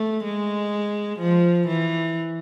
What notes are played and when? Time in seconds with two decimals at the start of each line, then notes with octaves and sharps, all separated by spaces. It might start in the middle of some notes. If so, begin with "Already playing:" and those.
Already playing: A3
0.24 G#3
1.19 F3
1.67 E3